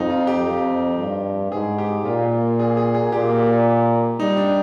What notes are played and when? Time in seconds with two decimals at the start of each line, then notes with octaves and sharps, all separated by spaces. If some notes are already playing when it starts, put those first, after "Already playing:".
Already playing: F2 D#4
0.10 F4
0.27 G4
0.45 F2
0.99 G2
1.52 G#2 G#4
1.78 G4
2.05 A#2 F4
2.59 G#4
2.77 G#4
2.94 G#4
3.12 A#2 G4
4.19 G3 D#4
4.37 D4